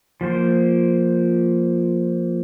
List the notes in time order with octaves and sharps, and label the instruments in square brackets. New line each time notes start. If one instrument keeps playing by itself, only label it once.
[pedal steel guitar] F3 A#3 C5